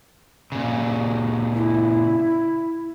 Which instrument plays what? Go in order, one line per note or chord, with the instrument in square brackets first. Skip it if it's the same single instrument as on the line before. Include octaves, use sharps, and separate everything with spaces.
[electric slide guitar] A#2 C#3
[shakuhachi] E4